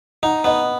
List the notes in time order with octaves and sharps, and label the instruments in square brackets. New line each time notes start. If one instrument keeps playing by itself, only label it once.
[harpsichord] D#4 [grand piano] F#5
[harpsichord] B3 [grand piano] D#5